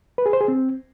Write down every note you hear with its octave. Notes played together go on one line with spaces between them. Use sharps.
B4
G#4
C5
G#4
C4